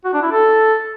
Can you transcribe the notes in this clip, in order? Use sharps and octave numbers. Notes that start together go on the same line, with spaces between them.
F#4
D4
E4
A4